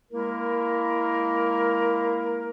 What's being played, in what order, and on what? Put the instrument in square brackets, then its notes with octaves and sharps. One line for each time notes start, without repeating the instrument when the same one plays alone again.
[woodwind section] G#3 A#3 E4 A#4